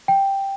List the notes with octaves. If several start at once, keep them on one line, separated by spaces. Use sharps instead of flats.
G5